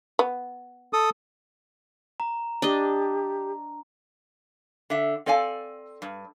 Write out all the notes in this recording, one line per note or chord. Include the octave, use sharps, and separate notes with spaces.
B3
A4 D#6
A#5
D4 G4 D#5
D3 E5
C4 A4 D5 F5 G#5
G2